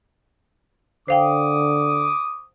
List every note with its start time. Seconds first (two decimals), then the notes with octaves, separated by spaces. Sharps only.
1.08 D3 C5 F5 G5 D6 D#6